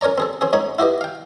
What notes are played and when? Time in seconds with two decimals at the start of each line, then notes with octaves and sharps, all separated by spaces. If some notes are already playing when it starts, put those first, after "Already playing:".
0.01 C#4 A#4 C#5 D5 A#5
0.18 C4 G#4 A4
0.41 C4 C#4 G#4
0.53 G#2 D#4 C#5 B5
0.79 E4 F#4 G4 B4 D#5
1.01 F5 G5